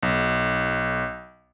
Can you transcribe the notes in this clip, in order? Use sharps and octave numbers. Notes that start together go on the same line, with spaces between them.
B1